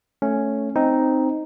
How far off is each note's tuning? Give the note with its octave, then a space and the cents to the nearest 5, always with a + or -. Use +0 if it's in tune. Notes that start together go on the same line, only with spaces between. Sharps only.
A3 +0 C#4 +0
C4 +0 D#4 +0